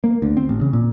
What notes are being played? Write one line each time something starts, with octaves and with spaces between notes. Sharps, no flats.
A#3
D2
C4
A1
C#3
A#2